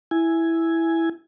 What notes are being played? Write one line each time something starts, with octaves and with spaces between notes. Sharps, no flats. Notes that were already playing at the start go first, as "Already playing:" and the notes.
E4 G#5